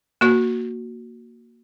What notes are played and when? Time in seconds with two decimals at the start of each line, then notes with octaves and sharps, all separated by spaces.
0.21 A#3 F#4